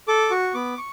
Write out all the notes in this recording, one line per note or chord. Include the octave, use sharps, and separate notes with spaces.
A4 D6
F#4 C#6
B3 D6
C#6